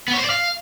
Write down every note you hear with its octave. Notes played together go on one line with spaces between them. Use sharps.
B3
C#5
C5
D5
F5